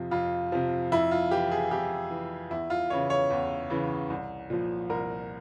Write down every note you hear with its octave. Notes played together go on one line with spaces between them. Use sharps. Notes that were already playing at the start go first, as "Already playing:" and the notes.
Already playing: F2 C3 F3 F4
F2 F4
C3 F3
F2 E4
F4
E3 G4
G#4
F2 G4
E3
E2 E4
F4
C#3 E3 C#5
C#5
E2
C#3 E3
C2
A#2 F3
C2 A#4